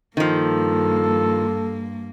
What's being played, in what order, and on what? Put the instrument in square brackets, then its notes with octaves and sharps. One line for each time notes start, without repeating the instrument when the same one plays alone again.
[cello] G2 A#3 [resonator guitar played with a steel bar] D#3 F3 [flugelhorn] A4